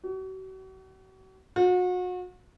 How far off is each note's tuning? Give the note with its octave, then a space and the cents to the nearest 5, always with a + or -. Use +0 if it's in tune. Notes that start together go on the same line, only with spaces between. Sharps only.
F#4 +40
F#4 -35